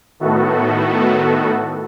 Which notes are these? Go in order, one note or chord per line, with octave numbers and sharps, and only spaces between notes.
A2 D#3 A3 B3 F#4 A4